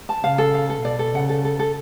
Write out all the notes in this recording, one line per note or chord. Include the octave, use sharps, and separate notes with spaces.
A5
C#3 F5
A4
F5
A4
B2 D5
A4
C#3 F#5
A4
A4
A4